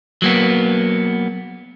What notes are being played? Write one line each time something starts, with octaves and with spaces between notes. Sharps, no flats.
F#3 A#3 B3